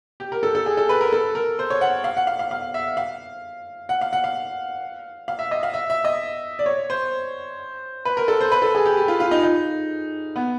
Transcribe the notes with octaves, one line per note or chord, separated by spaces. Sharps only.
G4
A#4
A4
A4
G#4
A4
B4
A#4
A4
A#4
C5
C#5
F#5
F5
F#5
F5
F5
F5
E5
F5
F#5
F5
F#5
F5
F5
E5
D#5
F5
E5
E5
D#5
D5
C#5
C5
B4
A#4
A4
C5
B4
A4
G#4
G4
G4
F4
F4
D#4
D#4
B3